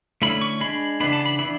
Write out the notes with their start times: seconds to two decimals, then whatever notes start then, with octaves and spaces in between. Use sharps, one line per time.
0.22 D3 A3 C#4 E4 B5
0.42 C#6
0.61 G#3 D4 B5
1.00 C#3 E3 B3 D4 B5
1.13 A5
1.26 B5
1.39 E3 B3 D4 B5